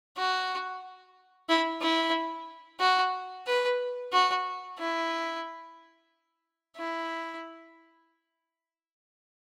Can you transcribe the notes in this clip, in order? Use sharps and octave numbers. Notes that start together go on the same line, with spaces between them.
F#4
E4
E4
F#4
B4
F#4
E4
E4